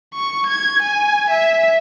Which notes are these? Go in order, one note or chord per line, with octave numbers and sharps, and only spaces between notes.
C#6
G#6
G#5
E5